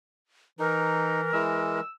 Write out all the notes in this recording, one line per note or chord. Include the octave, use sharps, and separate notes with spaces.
E3 D#4 A#4
E3 G#3 E6